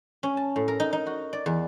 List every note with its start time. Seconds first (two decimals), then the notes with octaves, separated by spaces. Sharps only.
0.23 C#4
0.37 A5
0.56 A2
0.68 A#4
0.80 D#4
0.93 D#4
1.06 F#4
1.33 D5
1.46 E2